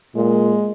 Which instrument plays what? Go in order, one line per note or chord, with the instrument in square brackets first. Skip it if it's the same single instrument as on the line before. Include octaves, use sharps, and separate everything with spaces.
[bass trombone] A#2 [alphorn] G#3